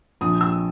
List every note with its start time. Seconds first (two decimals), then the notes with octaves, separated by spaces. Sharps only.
0.21 A#1 D#6
0.41 E6